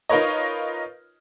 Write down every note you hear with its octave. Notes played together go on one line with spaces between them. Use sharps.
D#4 F4 A#4 B4 C#5 D#5